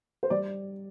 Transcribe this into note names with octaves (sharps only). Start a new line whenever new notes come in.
C5
G3 D5